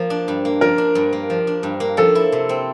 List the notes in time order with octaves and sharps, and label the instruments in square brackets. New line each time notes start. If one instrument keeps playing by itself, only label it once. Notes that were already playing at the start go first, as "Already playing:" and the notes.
Already playing: [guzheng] F3 A#3
D4
G2
A#3
[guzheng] F3 [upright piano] A#4
[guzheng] D4
G2
A#3
F3
D4
G2
A#3
[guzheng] F3 [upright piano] A4
[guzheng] E4
C3
C4